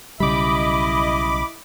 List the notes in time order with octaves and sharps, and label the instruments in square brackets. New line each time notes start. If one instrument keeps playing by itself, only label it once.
[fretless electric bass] B1 C#3 G3 [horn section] E4 D#5 [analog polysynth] B5 D6